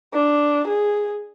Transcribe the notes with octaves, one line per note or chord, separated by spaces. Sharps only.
D4
G#4